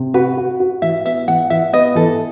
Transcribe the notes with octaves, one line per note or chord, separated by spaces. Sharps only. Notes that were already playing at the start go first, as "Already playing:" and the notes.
Already playing: C3
F#4 B4
F#4
F#4
E3 E5
B3 E5
E3 F#5
E3 E5
B3 D#5
E3 A4